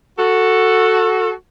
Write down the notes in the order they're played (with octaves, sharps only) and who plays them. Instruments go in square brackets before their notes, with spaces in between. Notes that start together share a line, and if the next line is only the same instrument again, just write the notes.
[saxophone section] F#4 A4